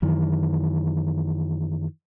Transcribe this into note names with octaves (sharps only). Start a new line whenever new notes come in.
F#2 D#3 E3